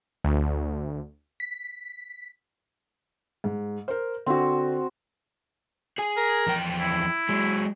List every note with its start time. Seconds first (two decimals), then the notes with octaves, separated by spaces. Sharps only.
0.24 D2
1.40 B6
3.44 G#2
3.88 A#4 C5
4.26 D3 C4 F#4
5.98 G#4 G#5
6.17 A#4
6.47 E2 F3 G5
6.81 E4
7.29 F#3 G#3